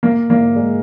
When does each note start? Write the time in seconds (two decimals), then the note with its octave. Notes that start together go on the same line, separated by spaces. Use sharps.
0.03 A#3
0.30 A#3
0.56 G#3